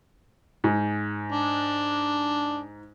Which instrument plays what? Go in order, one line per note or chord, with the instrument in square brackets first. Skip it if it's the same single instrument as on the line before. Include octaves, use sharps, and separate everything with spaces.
[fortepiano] G#2
[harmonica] D4